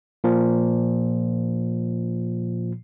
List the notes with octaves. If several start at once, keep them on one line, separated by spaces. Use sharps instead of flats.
A#2 F3